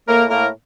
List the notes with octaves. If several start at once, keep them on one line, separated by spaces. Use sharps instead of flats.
A2 A#3 A#4
A2 A#3 A#4